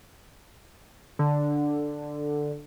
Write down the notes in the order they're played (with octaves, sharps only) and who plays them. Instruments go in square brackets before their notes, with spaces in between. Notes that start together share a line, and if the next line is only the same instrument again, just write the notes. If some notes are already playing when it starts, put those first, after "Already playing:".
[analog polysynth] D3